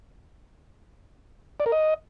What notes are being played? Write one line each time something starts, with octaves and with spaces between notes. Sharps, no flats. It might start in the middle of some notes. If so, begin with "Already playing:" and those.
D5
A#4
D#5